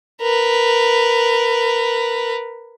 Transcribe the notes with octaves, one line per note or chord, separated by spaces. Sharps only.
A#4 B4